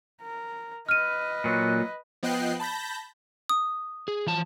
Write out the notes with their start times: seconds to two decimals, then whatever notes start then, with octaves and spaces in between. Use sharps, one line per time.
0.22 A#4
0.89 B4 D#5 F6 D#7
1.44 A#2 F#3
2.23 F3 B3 D#5 G5 F#6 C7
2.60 A5 B5 G6 A#6
3.49 D#6
4.08 G#4
4.27 E3 F3 A5